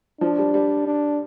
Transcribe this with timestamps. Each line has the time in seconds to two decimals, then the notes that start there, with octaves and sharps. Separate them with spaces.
0.21 F3 D4
0.38 G3
0.54 G3
0.87 D4